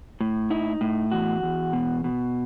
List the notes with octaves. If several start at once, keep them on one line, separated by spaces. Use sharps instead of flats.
A2
D#4 E4
A2
E2 F#4
E2
B2
B2